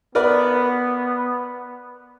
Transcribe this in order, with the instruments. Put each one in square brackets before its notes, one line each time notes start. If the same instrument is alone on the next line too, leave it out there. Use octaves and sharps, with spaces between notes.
[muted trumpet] B3 [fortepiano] A#4 B4 D5